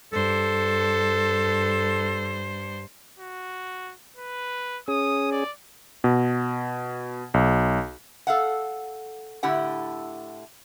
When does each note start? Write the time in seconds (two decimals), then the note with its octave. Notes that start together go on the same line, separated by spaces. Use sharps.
0.13 G2 A4 C5
3.19 F#4
4.17 B4
4.88 C#4 G#4 D#6
5.31 D5
6.04 B2
7.34 B1
8.27 A4 F5 F#5
9.43 A2 D3 E4 G4 F#5